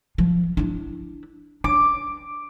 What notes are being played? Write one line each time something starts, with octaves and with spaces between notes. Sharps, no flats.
F3
D4 E4
D4 D6